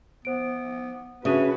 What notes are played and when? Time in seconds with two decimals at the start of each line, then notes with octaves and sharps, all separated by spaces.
0.25 B3 C5 D7
1.25 C#3 D4 F#4 B4 E5 D#6 D#7